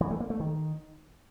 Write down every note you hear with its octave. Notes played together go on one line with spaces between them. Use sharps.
E3
A3
A#3
A3
D#3